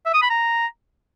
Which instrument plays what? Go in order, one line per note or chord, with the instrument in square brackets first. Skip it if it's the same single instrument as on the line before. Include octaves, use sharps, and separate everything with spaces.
[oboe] E5
D#6
B5
A#5